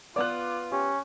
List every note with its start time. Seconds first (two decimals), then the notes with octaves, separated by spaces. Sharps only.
0.16 B3 F4 D5 D6 F#6
0.72 C#4 G4